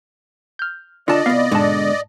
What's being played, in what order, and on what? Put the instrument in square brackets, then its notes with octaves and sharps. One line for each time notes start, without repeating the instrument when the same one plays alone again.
[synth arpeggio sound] F6 G6
[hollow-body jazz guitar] D3 A5 [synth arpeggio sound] F4 [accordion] D5 D#5
[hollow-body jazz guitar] C2 B3 [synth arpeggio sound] F5
[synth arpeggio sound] G#2 A5 [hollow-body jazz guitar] B2 D3 G#3